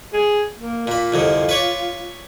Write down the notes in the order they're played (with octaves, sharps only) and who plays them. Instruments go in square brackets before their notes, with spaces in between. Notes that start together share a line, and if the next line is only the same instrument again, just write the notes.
[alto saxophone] G#4
A#3
[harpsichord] A#2 B5 [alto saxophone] F4
[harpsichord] C2 F2 D3
B4 C#5 D5